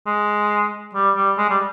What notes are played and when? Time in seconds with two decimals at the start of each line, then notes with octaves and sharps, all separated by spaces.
0.06 G#3
0.95 G3
1.15 G3
1.38 G#3
1.49 G3